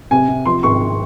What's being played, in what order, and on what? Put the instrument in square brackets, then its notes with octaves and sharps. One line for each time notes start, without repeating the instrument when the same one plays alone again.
[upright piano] C3 G#5
C3
F3 C6
G#1 C#6